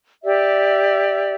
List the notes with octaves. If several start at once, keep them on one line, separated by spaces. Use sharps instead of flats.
G4 D5 E5